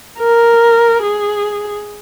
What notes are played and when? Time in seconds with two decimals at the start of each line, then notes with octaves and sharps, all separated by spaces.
0.19 A#4
1.03 G#4